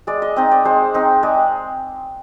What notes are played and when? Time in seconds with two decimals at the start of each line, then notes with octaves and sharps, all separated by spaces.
0.07 G#3 D5
0.22 D#5
0.36 C4 D#4 D#5
0.51 D5
0.65 G#3 C5
0.94 C4 D#4
1.23 G#3 D5